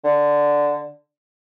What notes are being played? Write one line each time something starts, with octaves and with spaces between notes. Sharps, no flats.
D3